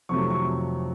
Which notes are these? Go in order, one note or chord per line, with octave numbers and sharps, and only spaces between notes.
F2 C3 D#3 F#3 A3 C#6
C#6